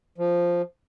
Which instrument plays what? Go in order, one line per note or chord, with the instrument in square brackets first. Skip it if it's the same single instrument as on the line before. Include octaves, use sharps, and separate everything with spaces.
[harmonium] F3